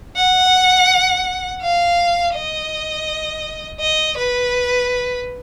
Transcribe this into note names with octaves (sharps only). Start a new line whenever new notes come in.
F#5
F5
D#5
D#5
B4